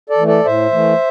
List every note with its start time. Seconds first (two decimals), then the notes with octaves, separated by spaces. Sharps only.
0.10 A4 D5
0.18 E3 A3
0.27 A4 D5
0.45 A2 C5 E5
0.72 E3 A3